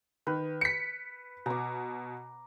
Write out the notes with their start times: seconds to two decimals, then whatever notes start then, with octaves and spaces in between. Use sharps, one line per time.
0.27 D#3 B4
0.61 B6 C#7
1.46 B2 A#5 D6